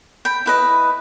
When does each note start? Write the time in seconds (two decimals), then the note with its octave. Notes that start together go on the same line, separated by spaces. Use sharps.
0.25 G5 B5
0.46 E4 B4 D#5